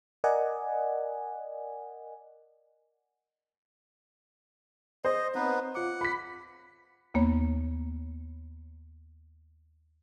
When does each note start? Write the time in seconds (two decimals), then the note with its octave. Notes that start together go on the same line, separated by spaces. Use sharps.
0.24 A#4 D5 D#5 F#5 G#5
5.05 C5 D#5
5.35 B3 C4 D#4 B4 C#5
5.75 F4 F#5 D6
6.01 B5 B6
7.14 D#2 A#3 B3 C#5